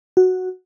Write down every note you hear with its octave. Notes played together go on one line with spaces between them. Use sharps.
F#4